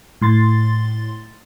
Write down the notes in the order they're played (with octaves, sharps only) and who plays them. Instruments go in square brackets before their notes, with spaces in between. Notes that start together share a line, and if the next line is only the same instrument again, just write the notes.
[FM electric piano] A2 C6 A6